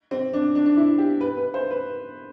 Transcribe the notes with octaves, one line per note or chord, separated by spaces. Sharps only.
C4
D4
D4
D4
E4
G4
B4
B4
C5
B4